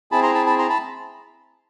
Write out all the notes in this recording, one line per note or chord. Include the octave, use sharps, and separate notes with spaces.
C4 E4 G#4 A5 B5
A#5 C6
A5 B5
A5 B5
A#5 C6
A5 B5